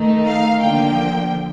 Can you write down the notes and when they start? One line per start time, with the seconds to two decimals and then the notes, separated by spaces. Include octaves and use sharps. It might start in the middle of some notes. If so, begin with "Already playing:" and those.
Already playing: D#3 A3 D#4
0.25 F5
0.61 D3 F3 A#3 G5